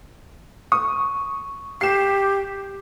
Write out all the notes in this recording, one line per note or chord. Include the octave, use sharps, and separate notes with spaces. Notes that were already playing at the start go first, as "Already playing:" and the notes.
C#6 D#6
G4 C7 E7